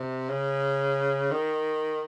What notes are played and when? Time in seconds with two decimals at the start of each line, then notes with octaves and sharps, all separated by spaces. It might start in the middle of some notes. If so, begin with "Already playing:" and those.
Already playing: C3
0.30 C#3
1.31 D#3